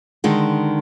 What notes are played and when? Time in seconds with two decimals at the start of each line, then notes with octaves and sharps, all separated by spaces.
0.24 D3 D#3 G#3